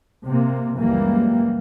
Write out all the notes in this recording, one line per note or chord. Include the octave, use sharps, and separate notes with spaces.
C3 A#3
C#2 F#2 E3 G3 A#3